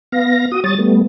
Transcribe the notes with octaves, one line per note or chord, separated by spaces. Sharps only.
B3 F5 A#6
F#4 D#6
G3 C#5 D#6 A6
G3 A3 B3